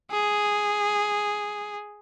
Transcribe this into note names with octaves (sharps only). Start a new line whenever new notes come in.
G#4